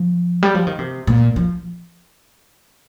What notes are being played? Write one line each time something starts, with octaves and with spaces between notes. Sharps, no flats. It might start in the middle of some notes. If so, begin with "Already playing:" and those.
Already playing: F3
G3
F3
D#3
C3
A#2
F3